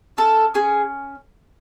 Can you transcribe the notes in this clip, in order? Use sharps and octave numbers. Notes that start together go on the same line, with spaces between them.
C#4 A4 A5
C#4 G#4 G#5